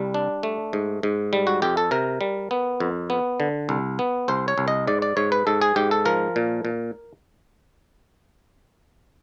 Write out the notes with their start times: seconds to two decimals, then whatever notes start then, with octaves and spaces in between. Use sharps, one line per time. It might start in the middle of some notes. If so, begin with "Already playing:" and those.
Already playing: C2 G3
0.14 D4
0.43 A3
0.73 G#2
1.03 G#2
1.33 G3
1.47 F#4
1.62 F2 G4
1.77 A4
1.91 C3 A#4
2.21 G3
2.51 B3
2.80 F2
3.10 B3
3.40 D3
3.69 C2
3.99 B3
4.28 C2 C5
4.48 C#5
4.58 C2
4.68 D#5
4.87 G#2 D5
5.02 D5
5.17 G#2 C#5
5.32 B4
5.47 G#2 A4
5.62 G#4
5.76 G#2 G4
5.91 A4
6.05 F3 A#4
6.36 A#2
6.65 A#2